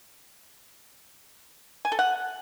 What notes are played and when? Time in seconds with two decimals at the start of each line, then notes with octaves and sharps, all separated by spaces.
1.85 G#5
1.92 A4
1.99 F#5